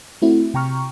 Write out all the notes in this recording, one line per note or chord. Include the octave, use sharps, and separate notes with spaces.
A3 C4 E4 F#4
C3 G5 A#5 C#6 F6